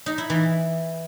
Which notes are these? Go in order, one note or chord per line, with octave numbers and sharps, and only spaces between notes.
D#4
E4
E3